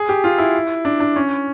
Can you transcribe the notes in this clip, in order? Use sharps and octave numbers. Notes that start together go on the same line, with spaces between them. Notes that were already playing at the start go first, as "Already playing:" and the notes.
Already playing: G#4
G4
F4
E4
D4
D4
C#4